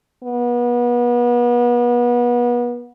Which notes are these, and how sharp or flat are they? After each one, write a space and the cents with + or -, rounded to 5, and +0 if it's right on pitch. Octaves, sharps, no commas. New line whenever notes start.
B3 -30